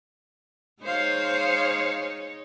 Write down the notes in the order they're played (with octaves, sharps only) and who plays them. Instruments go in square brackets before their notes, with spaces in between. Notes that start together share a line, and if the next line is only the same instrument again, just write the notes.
[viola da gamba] G#3 D#4 C#5 [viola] C5 F5